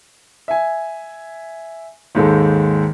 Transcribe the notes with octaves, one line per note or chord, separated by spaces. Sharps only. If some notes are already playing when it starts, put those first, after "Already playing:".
E5 G#5
D#2 G#2 G#3 A4